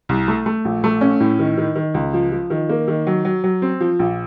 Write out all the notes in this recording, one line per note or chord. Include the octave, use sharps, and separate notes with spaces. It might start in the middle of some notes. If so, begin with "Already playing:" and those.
C2
A3
A3
A#1
A3
C#4
A2
D#3
D#3
D#3
C#2
F3
F3
D#3
A#3
D#3
F#3
F#3
F#3
C4
F3
A#1